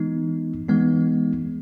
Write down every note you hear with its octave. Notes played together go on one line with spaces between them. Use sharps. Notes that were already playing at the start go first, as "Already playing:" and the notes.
Already playing: E3 G#3 B3 D#4
E3 G#3 B3 D#4